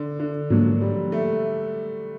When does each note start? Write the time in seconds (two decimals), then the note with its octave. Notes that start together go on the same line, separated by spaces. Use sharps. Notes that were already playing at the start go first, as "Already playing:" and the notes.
Already playing: D3
0.20 D3
0.50 G#2 F3 F#3 A#3 D4
0.81 G3
1.12 A3